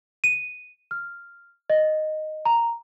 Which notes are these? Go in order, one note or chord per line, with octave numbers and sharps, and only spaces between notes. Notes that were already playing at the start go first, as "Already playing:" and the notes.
D#7
F6
D#5
A#5